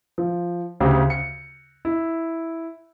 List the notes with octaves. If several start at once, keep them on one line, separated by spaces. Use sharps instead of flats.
F3
D2 C#3 G4 C5
C#7
E4